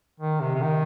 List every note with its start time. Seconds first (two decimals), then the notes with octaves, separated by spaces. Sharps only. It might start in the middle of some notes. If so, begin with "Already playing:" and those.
0.20 D#3
0.41 C3
0.55 C3
0.62 D#3